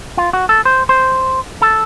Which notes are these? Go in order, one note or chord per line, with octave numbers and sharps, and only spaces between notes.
F4
F#4
A4
C5
C5
A4